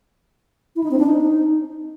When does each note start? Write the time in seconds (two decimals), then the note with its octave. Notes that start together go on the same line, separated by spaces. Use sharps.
0.76 E4
0.83 D#4
0.91 C4
0.99 D4
1.07 D#4